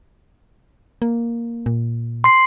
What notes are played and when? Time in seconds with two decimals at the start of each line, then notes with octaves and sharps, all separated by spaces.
1.02 A#3
1.66 A#2
2.24 C6 C7